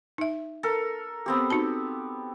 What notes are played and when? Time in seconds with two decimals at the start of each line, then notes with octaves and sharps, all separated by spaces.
0.18 D#4 E5
0.63 A4 A#4
1.26 B3 C4 G4
1.50 D#4 F#4 A5